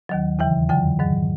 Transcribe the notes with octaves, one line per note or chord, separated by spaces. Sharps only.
D#2 D#3 F#3
E2 C#3 E3 G5
F2 D3 F#3 G5
G#2 D#3 F#3